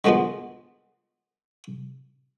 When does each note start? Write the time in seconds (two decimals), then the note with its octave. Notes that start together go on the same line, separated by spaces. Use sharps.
0.04 D3 D#3 F3 G#3 B3